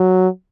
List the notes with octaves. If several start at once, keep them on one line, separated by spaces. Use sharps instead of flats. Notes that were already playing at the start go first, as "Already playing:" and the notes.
Already playing: F#3